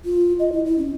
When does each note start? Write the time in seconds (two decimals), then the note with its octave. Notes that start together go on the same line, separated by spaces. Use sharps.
0.05 F4
0.39 D#5
0.52 E4
0.65 E4
0.78 C#4